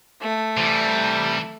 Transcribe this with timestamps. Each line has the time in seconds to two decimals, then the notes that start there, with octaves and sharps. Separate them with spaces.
0.21 A3
0.57 C3 E3 G3